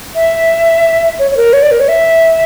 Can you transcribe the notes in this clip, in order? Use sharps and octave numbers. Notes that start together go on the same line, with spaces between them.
E5
C#5
C#5
A#4
C#5
D5
A#4
C#5
E5